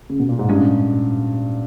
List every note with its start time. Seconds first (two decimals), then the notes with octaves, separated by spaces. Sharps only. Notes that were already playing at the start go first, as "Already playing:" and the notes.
0.10 C#3
0.19 B2
0.29 A#2
0.39 G#2
0.49 G2 A#2 G#3 C#4